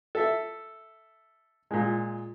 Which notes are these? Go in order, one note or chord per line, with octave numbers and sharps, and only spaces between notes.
A4 E5
A#2 G#3